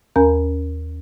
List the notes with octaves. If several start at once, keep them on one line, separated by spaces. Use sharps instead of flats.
D#2 C#4 A#4 G#5 A#5 G6